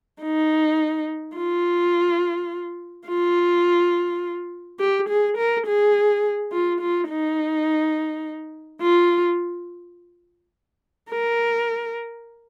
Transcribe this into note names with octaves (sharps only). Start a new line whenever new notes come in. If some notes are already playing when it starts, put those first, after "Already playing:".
D#4
F4
F4
G4
G#4
A#4
G#4
F4
F4
D#4
F4
A#4